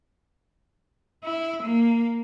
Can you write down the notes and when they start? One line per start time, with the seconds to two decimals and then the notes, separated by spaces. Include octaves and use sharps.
1.24 E4
1.63 A#3